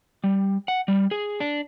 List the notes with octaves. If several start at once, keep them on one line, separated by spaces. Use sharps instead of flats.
G3
F#5
G3
G#4
D4